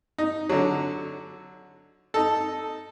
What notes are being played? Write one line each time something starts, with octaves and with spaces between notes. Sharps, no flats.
D#4
D3 F#3
D#4 A4